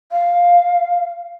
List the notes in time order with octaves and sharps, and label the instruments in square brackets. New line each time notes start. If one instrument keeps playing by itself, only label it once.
[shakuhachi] F5